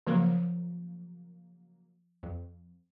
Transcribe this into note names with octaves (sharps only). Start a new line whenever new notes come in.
C#3 F3 F#3 A#3
F2